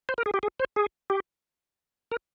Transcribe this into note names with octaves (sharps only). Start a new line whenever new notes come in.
C5
A#4
G#4
G4
G#4
C5
G#4
G4
A#4